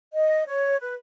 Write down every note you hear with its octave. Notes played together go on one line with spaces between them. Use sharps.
D#5
C#5
B4